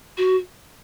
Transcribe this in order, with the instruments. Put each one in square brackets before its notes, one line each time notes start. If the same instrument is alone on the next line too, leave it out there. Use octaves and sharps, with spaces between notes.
[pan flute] F#4